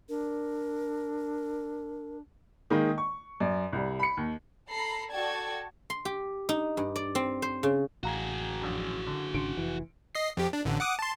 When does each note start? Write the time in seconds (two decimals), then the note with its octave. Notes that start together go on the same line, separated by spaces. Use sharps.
0.09 D4 A#4
2.70 D#3 G#3 A#3 D#4
2.98 C#6
3.40 F#2 D5
3.73 C2 G3
4.00 B5 C#7
4.17 D#2
4.70 A4 A#5 B5 C7
5.11 F#4 A4 D5 G5 A5 G#6
5.90 C6
6.05 G4
6.49 D#4
6.77 G2
6.96 D5
7.15 C4
7.42 C5
7.63 C#3
8.03 A1 F#4 G#4 F5 A#5
8.61 A#1 F#2
9.07 D3
9.34 G#1 C#3 D4 C6 C#7 D7
9.57 F1 E3
10.15 D#5 C7
10.37 F2 G4
10.53 D4
10.65 A1 D3
10.80 F#5 D6 D#6
10.99 A5 C6